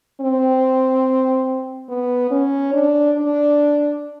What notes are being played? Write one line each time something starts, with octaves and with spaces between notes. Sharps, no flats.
C4
B3
C#4
D4
D4